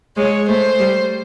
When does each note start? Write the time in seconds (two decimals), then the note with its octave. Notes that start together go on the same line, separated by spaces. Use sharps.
0.17 G#3 C#5
0.48 A3 C5
0.79 G3